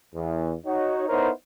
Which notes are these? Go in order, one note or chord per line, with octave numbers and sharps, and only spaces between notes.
E2
D#4 F#4 C#5
B3 D#4 E4 A#4 C5 C#5